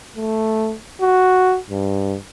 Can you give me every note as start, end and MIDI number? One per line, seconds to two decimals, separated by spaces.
0.17 0.75 57
1.02 1.58 66
1.71 2.17 43